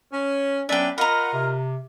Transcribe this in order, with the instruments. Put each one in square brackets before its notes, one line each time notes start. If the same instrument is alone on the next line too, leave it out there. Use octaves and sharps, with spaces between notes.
[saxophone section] C#4
[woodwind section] F#3 B3 C#4 [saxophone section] D4 B4 D5 [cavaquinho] E5 G5
[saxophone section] F4 A#4 [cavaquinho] D#5 A#5 [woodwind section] F#5 B5
[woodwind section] C3